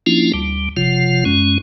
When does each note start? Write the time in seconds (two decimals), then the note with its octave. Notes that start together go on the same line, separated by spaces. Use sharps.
0.06 F3 A#3 C#4 D4 E4 F4
0.34 D2 G3
0.77 F#1 C3 F3 F4
1.25 F#2 G#3 C#4